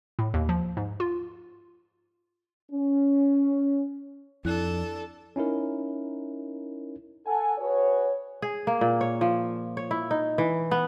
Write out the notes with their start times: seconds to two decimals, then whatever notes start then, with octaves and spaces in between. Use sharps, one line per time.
0.19 A2
0.34 D#2
0.49 F3
0.77 G#2
1.00 F4
2.72 C#4
4.45 F2 D4 E4 A4 F#6
5.36 C#4 D#4 E4 A#4
7.26 A4 F#5 G#5
7.58 F#4 G#4 B4 C#5
8.42 G#4
8.67 A#3
8.81 A#2
9.01 C#5
9.21 F3
9.77 C#5
9.91 E4
10.11 D#4
10.38 E3
10.71 B3